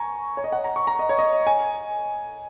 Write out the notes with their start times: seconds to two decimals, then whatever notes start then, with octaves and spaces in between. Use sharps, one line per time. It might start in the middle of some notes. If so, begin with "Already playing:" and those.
Already playing: G#5 A#5 C#6
0.37 C#5
0.44 D#5
0.52 F#5
0.64 A#5
0.76 C#6
0.87 A#5
0.99 D#5
1.09 C#5
1.19 D#5
1.47 G#5